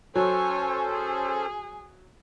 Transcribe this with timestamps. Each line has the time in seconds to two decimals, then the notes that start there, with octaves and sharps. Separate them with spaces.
0.15 F#3 C#4 A4 C5 C#5 G#5
0.91 G#4